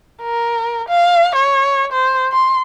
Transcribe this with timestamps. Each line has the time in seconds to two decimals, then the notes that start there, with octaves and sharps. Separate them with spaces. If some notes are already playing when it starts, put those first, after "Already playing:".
0.22 A#4
0.89 F5
1.36 C#5
1.93 C5
2.32 C6